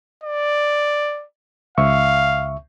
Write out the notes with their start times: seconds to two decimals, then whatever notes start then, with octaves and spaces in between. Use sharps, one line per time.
0.24 D5
1.78 C#2 E5 F5 C#6